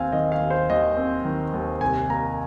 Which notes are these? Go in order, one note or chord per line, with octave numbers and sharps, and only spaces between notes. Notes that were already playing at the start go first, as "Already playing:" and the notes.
Already playing: D#2 C4 F5 G#5
D#3 D#5
F5
D#2
C5
D#2 D#5
C4
D#3
D#2
C2 G#5
A#3 A#5